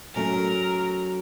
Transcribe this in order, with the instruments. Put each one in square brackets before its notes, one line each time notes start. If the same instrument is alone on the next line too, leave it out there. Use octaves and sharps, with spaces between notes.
[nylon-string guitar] F#3 A3 C#4 [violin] A#4